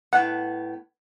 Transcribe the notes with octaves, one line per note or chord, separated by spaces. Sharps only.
A2 B3 F#5